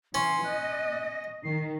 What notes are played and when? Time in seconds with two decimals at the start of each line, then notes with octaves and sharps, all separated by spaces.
0.14 E3 C#4 C6
0.44 D#5 F#6
1.06 A#6
1.44 D#3 C7